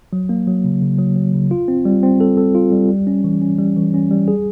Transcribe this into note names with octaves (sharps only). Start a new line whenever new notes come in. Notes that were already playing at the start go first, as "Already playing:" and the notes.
F#3
A#3
F#3
C#3
C#3
F#3
F#3
C#3
F4
C4
G3
C4
A4
A4
F4
G3
G3
C#4
E3
C#4
G3
E3
C#4
G3
G#4